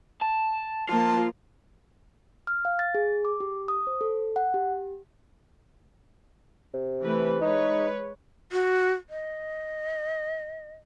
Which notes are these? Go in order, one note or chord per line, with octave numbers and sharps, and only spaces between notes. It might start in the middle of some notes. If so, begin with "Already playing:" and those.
A5
F3 A#3 F4 A5
F6
F5
A6
G#4
D6
G4
D#6
C5
A4
F#5
G4
C3
E3 A3 B4
G#3 D#4 B4 C#5
F#4
D#5